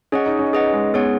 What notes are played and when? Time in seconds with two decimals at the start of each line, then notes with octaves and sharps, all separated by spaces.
0.12 C#4 G#4 D#5 F#5
0.26 D#4
0.39 C#4
0.52 B3 G#4 D#5 F#5
0.73 G#3
0.94 B3 G#4 C#5 F#5